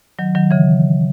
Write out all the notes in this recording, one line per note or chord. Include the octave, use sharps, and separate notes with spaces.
D#3 F#3
D#3 F#3
C#3 E3